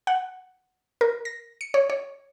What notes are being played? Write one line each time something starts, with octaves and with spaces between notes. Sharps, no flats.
F#5
A#4
A#6
C#7
C#5
C#5